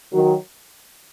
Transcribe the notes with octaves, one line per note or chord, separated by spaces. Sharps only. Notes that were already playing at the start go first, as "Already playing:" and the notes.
D#3 F#3